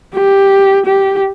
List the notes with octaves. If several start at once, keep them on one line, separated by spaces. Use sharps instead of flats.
G4
G4